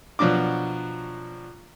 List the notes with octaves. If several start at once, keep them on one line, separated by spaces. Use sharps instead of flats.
B2 F3 F#3 D4 D6